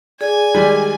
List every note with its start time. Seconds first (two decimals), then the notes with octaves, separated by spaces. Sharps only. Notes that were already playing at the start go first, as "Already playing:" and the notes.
0.21 G#4 D5 G#5
0.54 D#3 G3 G#3